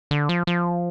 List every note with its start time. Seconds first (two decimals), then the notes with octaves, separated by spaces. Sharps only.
0.11 D3
0.29 F3
0.47 F3